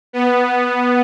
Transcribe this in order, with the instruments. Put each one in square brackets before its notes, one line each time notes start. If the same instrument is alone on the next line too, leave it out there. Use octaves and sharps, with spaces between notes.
[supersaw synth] B3